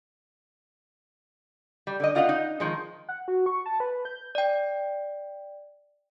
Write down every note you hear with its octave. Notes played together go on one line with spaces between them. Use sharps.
G3
D3 D#5
B2 F4 D#5 F5 F#5
D#4
D#3 F3 G#3
F#5
F#4
C#6
A5
B4
G6
D5 G5